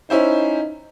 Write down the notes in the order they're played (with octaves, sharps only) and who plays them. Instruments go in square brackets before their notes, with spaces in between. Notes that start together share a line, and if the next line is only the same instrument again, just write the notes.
[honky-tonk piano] C#4 E4 C5 [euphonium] D#4